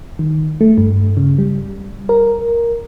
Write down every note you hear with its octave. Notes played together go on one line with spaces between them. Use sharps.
D#3
A3
G2
C#3
G3
A#4